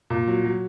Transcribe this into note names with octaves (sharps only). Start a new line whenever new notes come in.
A#2
F#3
F#3